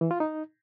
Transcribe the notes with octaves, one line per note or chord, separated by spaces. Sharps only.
E3
F4
D#4